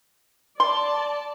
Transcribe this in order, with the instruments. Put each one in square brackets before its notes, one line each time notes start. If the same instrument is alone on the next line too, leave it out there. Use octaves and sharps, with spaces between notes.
[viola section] D5 A5 [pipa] C6